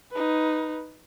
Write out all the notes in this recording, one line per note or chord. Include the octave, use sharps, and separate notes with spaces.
D#4 B4